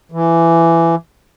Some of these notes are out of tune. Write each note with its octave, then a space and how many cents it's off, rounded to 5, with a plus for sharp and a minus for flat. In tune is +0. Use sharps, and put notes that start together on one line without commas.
E3 +20